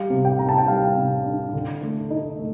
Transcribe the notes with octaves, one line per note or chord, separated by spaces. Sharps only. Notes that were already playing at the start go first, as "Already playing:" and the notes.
Already playing: G3 F5
C3
G5
C3 A#5
A5
G5
G3 F5
C3
D4
D3
A3
D#4
A3